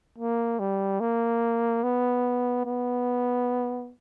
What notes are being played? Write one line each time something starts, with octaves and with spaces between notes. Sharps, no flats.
A#3
G3
A#3
B3
B3